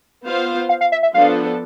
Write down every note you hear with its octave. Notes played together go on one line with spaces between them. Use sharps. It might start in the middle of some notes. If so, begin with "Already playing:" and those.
B3 F4 C5 F5
F5
F5
E5
E5
F3 B3 D4 A4 F5